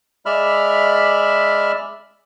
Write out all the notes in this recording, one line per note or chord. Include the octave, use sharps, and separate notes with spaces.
G#3 D5 E5 B5 F6